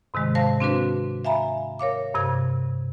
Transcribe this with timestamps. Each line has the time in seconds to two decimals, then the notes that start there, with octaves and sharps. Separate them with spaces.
0.14 G#2 C3 D#3 G#3
0.35 C5 F5 A5 A#6
0.60 C4 D4 F#4 B4
1.25 E5 F5 G#5 A#5 B5
1.79 A#4 C#5 F5 D6
2.14 G2 C3 G#6